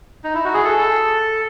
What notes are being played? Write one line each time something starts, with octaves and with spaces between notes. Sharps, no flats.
D#4
E4
F#4
G#4
A4